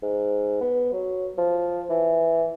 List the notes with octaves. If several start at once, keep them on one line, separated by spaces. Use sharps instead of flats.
G#2
B3
F#3
F3
E3